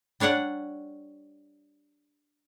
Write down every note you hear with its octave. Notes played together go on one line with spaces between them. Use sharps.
G3 D4 C#5 D5 F#5